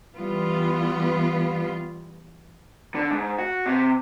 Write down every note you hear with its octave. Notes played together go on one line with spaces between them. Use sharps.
E3 G3 B3 F4
D3
G#2
F#4
C3